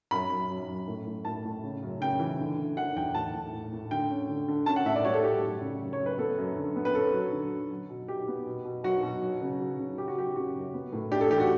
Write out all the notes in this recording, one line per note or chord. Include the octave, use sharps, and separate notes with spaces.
F#2 B5
F#2
F#2
F#2
A2
A2
A2 A5
A2
C#3
F#2
C#3 G5
E3
D3
D3
D3 F#5
E2 G5
A2 A5
A2
A2
A2
D3 G5
C#4
D3
D3
C#4 A5
F#5
A2 E5
D5
G3 C#5
A4
A2 G4
F#2
C#3
F#2
C#5
F#2
B4
B3 A4
F#2
D3
B3
B4
C#4 A4
F#3
D3
F#3
F#3
B2
F#3 G4
B3
B2
B2
F#3 F#4
B2
F#3
C#3
F#3
C#3
F#3 G4
F#4
F#3 G4
C#3 F#4
F#2
B3
A2
D4 G4
A4
E3 G4
F#4